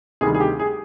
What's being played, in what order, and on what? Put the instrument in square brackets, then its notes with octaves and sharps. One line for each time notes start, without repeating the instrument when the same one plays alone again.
[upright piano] D2 C3 D#3 G3 G#4
G#4
G4
G#4